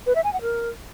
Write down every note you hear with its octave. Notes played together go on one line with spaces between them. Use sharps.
B4
E5
G#5
F#5
A#4